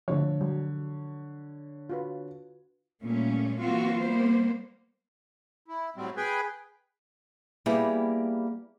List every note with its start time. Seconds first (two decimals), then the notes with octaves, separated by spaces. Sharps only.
0.08 D3 F3 A3 C#5
0.41 F#3 G3
1.90 F4 F#4 B4
3.02 A#2 G3 A3 C#4
3.59 E3 F#3 A#3 C4 F4 F#4
4.01 G3 A#3 B3 C5
5.68 E4
5.96 A2 F#3 G3 C4
6.17 G#4 B4 G5 G#5
7.66 G3 A#3 B3 E4 G4 G#4